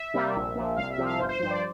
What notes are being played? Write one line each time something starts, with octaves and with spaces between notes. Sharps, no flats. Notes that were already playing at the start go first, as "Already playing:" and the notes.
Already playing: E5
C3 G3 A#3
A#1
A#2 F3
C2 F5
E5
C3 F3
F5
G1 C5
C5
G2 F3 C5
D5